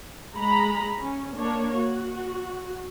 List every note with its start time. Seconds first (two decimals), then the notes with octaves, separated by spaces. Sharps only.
0.38 G#3 A#5 B5
1.02 C#4
1.37 A#3 D4 C#5
1.78 F#4